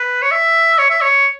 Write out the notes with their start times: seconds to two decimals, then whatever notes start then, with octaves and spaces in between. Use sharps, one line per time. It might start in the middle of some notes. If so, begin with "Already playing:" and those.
Already playing: B4
0.22 C#5
0.31 E5
0.78 C#5
0.90 E5
1.01 C#5